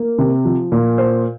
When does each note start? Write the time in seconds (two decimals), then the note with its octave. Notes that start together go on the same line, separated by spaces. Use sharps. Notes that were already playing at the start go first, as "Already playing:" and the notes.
Already playing: A#3
0.18 C3
0.45 F3
0.72 A#2
0.98 C5